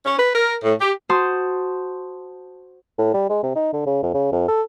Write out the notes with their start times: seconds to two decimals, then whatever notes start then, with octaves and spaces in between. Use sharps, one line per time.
0.05 C#4
0.19 B4
0.35 A#4
0.63 A2
0.80 G4
1.09 F#4 C5 A5 C6 D#6
2.98 A2
3.14 G3
3.29 G#3
3.43 C3
3.55 D#4
3.73 D3
3.86 C#3
4.03 F2
4.14 C#3
4.32 F2
4.48 A4